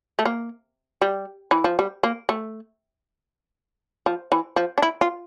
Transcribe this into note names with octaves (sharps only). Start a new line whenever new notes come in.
A3
A#3
G3
E3
F3
G3
A#3
A3
F3
E3
F3
D4
E4
F4